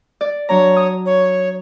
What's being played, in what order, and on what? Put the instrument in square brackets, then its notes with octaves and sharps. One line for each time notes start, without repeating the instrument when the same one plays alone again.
[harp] D5
[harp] F#3 D4 A#5 [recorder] C#5
[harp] D#6
[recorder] C#5